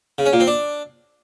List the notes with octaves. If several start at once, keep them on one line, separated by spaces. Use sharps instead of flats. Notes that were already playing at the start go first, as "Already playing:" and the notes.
C#3
C#4
A#2
C4
D4